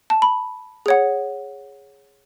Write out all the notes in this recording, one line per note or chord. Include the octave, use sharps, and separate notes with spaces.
A5
B5
G#4 C#5 F#5